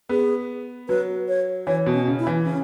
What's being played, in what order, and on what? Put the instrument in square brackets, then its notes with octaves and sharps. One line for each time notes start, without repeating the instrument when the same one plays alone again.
[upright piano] B3 [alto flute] G#4
[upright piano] F#3 [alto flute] B4
[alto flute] C#5
[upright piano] E3 [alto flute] C#5
[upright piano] B2
[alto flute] C#4
[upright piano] C#3
[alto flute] E4
[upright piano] E3
[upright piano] C#3 [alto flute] C#4